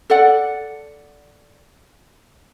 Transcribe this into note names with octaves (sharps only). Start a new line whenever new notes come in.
A4 D5 F#5